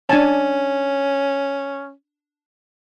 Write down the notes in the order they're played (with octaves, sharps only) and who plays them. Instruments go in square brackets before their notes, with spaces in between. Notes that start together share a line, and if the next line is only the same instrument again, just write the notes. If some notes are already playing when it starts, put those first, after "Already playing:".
[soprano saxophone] C#4 [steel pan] D4 G#5 A5